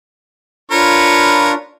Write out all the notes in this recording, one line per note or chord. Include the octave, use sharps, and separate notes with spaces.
D4 F4 A#4 B4 C#5